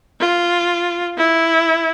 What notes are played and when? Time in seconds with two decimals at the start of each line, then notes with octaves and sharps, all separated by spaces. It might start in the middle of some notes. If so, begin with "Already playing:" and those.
0.20 F4
1.18 E4